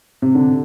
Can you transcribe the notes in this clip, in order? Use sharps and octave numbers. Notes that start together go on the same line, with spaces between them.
C3
D3